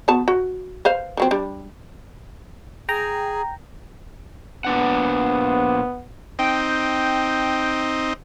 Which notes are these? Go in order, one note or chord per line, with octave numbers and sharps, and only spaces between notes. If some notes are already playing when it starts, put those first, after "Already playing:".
B3 F#4 A5
F#4
B4 C5 F5
F3 F#3 C4
G3 D4
G#4 G5 A#5
A#2 B3 D4 F#5
C4 D#4 G5